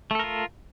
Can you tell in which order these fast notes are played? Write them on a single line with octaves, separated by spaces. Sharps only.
A3 A4 A#4 F4